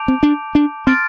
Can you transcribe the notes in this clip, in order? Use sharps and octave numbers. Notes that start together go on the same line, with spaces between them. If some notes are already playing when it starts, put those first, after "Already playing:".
Already playing: A5 D6 G6 D7 F7
C4
D4
D4
C4 C6 F6 A6 D7